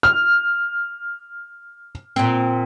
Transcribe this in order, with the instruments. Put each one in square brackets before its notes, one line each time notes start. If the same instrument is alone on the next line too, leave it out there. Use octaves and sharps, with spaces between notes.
[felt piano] F6
[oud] A#2 C4